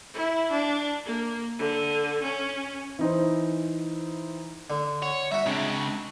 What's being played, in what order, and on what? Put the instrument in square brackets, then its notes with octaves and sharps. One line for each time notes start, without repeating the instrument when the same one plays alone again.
[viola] E4
D4
A#3
D3
C#4
[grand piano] E3 D#4 C5
[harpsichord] D3
[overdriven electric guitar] C#5 [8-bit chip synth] F#5
[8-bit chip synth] G3 [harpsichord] F#4 A#5 [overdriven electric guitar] E5
[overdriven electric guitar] C#2 C#3 [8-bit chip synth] G#3 C4 D4